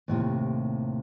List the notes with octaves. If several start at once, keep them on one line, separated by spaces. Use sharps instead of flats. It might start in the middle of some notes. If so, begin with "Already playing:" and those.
D#2 A2 C3